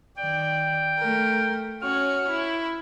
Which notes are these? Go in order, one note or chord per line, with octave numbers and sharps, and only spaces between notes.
D#3 D5 G5
A3 A#4
C#4 F#4 C#5 F6
E4